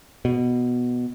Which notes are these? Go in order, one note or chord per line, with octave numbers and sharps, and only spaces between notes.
B2